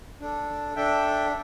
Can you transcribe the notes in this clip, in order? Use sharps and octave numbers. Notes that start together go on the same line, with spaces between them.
D4 A4
D4 A4 E5 G5